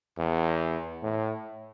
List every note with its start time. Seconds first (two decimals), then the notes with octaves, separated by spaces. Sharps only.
0.18 E2
1.03 A2